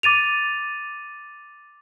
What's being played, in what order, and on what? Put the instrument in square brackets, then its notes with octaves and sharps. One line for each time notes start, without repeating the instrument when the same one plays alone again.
[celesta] D6 A6 D#7 F7